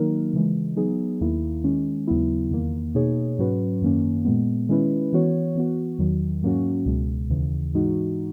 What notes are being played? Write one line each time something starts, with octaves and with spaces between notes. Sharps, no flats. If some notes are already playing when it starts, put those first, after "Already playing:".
Already playing: D#3 F#3 A#3 D#4 A#4
C#3 E3 G#3
F#3 B3 D#4 G#4
D#2 D#3 A#3 E4
D#3 G#3 C#4
D#2 C#3 F#3 B3 E4
E2 D#3 A#3
B2 A#3 D#4 G#4 C#5
G#2 F#3 C#4 F#4 B4
F#2 D#3 A#3 C#4
A#2 G#3 B3
D#3 G#3 C#4 E4 B4
E3 B3 F#4 C#5
E3 B3 F#4
E2 D#3 F#3
G#2 F#3 A#3 C#4 F#4
C#2 B2 G#3
D#2 C#3 E3
G#2 E3 G#3 D#4 F#4